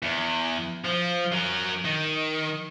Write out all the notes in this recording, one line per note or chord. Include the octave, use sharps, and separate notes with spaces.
E2
F3
F#3 A#4
D#3